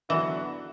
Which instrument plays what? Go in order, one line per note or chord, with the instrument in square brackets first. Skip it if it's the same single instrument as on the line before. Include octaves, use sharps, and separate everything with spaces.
[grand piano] D3 F#3 B3 D4 F#4 [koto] E3